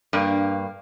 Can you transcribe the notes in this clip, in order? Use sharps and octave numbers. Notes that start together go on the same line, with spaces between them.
G2 A#3